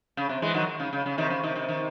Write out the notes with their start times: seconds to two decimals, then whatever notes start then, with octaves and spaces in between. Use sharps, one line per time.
0.17 C#3
0.29 C3
0.42 E3 G#3
0.54 D#3 F#3
0.80 C#3
0.93 C#3
1.06 C#3
1.18 C3 D#3
1.30 C#3
1.43 C3 D#3
1.55 C3 D#3
1.68 C3 D#3